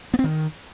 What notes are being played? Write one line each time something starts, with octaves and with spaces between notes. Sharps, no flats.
B3
C4
D#3